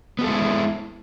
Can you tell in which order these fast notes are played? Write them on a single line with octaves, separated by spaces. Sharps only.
B3 F#4 A4 G#3 E4